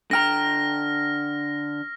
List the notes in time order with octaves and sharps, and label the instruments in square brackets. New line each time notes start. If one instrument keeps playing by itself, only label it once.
[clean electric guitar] D3 G5 A#5 [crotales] F6 A#6